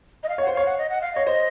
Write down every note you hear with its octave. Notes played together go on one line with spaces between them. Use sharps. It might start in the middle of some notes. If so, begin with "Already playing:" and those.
D#5
F5
C#5 F#5
C5
F5
C#5
F#5
D#5
F#5
F5
C#5 D#5
C5 D#5